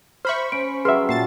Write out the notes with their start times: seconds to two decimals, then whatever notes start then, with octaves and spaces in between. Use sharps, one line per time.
0.25 C5 E5 B5 C#6 F6
0.52 C#4 D7
0.85 C#3 F#3 G3 G#4 B4 E5 C6 F6
1.09 A#2 A5 A6 C7